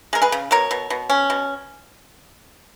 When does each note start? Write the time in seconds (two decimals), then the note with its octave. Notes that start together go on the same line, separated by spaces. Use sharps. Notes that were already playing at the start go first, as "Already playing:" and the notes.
0.13 G#3 A#4
0.22 G#4 B4
0.32 C#3
0.51 B2 A#4 C#5
0.71 B2
0.90 B2
1.10 C#4
1.30 B2